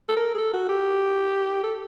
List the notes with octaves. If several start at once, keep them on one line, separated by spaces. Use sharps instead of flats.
A4
A#4
G#4
A4
F#4
G4
A4